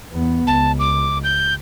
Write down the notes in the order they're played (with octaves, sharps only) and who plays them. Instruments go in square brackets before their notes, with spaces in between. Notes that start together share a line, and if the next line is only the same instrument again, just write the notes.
[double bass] E2 B3
[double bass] C#2 [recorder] A5
[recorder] D6
G6